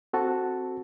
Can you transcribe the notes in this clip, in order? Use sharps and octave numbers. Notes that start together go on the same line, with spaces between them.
C4 F#4 A4 A5